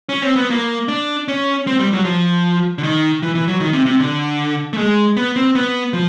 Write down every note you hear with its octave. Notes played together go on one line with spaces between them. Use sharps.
C#4
C4
B3
A#3
D4
C#4
C4
G3
F#3
F3
D3
D#3
E3
E3
F#3
D#3
C3
C3
D3
A3
G#3
B3
C4
B3
F3